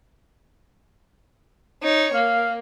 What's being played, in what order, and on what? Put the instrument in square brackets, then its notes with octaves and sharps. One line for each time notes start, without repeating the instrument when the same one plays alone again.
[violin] D#4 C#5
[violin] A#3 [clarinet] F5